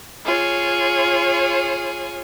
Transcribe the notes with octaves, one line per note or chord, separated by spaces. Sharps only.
F4 G#4 C#5